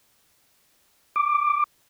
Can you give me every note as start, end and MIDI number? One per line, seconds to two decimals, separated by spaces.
1.16 1.64 86